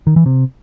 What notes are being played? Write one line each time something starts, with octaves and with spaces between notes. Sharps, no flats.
D#3
E3
C3